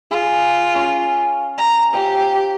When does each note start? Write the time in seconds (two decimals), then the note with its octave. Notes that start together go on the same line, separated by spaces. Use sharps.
0.11 F4 G#4
0.75 C#4 F5
1.58 A#5
1.93 F3 G4 G5 E6